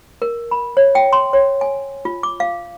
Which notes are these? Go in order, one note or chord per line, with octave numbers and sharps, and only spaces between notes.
A#4
B5
C#5
G5
C6
C#5
G#5
F4
D6
F5